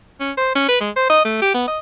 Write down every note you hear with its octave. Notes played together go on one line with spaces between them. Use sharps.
C#4
C5
C#4
B4
G#3
C5
D#5
A3
G4
B3
D#5